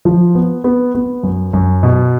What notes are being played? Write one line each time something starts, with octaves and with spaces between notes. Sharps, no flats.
F3
B3
B3
B3
F#2
F#2
B2